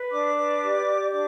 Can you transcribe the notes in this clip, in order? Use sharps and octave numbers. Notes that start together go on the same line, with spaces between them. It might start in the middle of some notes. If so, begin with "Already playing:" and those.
Already playing: B4
D4 D5 D6
B4
G4
G4
D4 D5 D6